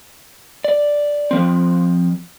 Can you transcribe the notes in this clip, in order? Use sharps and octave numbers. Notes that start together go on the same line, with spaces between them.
D5
F3 C4